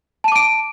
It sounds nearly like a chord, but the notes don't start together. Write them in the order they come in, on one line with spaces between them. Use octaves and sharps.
A5 D#7 D6 D7